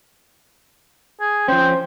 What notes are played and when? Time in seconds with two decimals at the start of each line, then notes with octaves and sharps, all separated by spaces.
1.20 G#4
1.48 F3 C#4 C5 G5